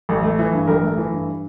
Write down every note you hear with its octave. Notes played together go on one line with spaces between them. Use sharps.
A1
A3
E3
G2
A1 A#4
A3
E3
G2